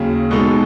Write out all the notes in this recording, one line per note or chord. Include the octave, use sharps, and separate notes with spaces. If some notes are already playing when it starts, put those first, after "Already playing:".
Already playing: D#2 C#3 F#3
B2 G#3 D#4 A4